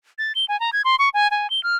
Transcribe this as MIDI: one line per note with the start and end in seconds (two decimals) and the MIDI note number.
0.18 0.32 93
0.35 0.45 103
0.48 0.59 80
0.60 0.70 82
0.73 0.82 92
0.85 0.96 84
0.99 1.09 85
1.14 1.30 80
1.31 1.50 80
1.50 1.63 103
1.63 1.76 89